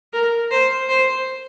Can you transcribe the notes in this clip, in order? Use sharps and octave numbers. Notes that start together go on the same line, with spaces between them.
A#4
C5
C5